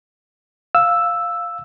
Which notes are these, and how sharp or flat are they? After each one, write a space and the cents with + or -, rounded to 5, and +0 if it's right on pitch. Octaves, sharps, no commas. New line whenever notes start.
F5 +0 E6 +0